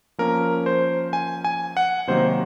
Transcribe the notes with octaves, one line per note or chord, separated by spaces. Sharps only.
F3 A#3 C#4 A#4
C5
G#5
G#5
F#5
C3 D#3 F#3 A#3 D#4 C5